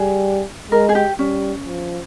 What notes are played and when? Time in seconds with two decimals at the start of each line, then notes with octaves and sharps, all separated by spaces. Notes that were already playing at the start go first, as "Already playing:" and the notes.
Already playing: G3 G#4
0.71 G#3 A#4
0.89 G#4
0.95 G4
1.19 G3 C#4
1.67 F3